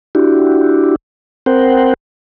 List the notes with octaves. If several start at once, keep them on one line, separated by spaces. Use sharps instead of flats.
D4 E4 F#4 G4
C4 A#4 C5 F#5 G5